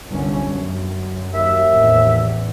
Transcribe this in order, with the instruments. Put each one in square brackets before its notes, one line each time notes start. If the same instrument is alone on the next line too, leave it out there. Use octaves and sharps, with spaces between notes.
[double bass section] G1 C2 C#4
F#2
[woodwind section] D#2 E5
[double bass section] A1 E2